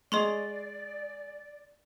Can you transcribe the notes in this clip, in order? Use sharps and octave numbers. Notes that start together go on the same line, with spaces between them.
G#3 G#4 D5 D#5 C6 C#6